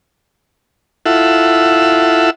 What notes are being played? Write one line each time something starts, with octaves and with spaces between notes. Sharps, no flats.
E4 F4 A4 E5 F#5